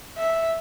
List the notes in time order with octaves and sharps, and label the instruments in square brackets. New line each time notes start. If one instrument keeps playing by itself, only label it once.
[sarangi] E5